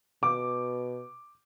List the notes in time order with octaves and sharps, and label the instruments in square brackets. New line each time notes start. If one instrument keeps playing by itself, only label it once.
[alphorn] B2 [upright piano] D6